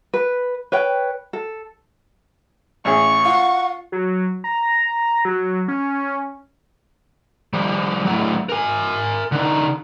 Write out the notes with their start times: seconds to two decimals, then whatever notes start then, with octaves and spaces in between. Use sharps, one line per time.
0.14 B4
0.72 B4 C#5 G5
1.33 A4
2.85 A1 C#4 G#4 C#6
3.25 F4 F#5
3.92 F#3
4.44 A#5
5.25 F#3
5.68 C#4
7.53 F3 G3
8.05 A2 F#3
8.49 A#4 G#5
9.32 D3 D#4